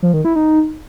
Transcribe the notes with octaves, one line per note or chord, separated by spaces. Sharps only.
F3
D#3
E4
D#4